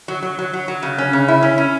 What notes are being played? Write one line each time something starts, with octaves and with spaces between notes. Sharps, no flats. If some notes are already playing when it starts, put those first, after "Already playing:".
F#3
F#3
F#3
F#3
F#3
C#3
C#4
C#3
E4
C#4
C#4